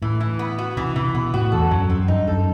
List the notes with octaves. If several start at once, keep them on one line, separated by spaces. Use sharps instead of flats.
A2 E3
E3
B3
F#4
C3 E3
C3 E3
B2 B3
A2 F#4
E2 A4
F#2 F#3
F#2 C4
G2 D#4
F#2 A4